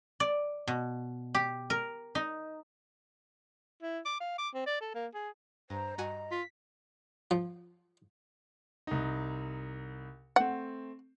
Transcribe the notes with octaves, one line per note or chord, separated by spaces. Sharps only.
D5
B2
G4
A#4
D#4
E4
D6
F5
D6
C4
D5
A4
A#3
G#4
G2 C5 A#5
G2 F#4 D#5 G#5
F4 B6
F3
C2 D#4
A3 C4 F#5